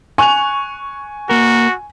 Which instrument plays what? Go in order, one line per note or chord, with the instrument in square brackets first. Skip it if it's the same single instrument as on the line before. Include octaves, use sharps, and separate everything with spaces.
[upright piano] G#5 [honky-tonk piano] C#6 F#6 F7
[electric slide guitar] A#3 A#4 [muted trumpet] F#4